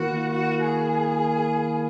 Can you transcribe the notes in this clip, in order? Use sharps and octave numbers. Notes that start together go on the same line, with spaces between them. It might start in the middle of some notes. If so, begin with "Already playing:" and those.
Already playing: D#3 A#3 E4 F#4 A#4
F#4
G#4